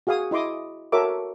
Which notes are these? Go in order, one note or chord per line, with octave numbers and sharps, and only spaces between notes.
F#4 G#4 F5 G#5 D#6
E4 D#5 C6 D6 D#6
F#4 A4 A#4 C#5 E5 D6